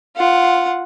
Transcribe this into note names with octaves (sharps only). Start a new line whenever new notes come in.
F4 F#5